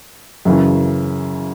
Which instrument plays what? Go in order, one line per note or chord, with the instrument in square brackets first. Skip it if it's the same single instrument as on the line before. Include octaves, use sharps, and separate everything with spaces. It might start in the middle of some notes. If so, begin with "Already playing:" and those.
[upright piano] F#2 C#3 E3